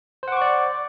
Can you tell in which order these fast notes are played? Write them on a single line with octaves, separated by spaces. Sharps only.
C5 F#5 D6 C#6 D5